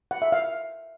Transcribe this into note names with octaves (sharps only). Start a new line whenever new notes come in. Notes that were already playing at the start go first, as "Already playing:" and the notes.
F#5
E5
F5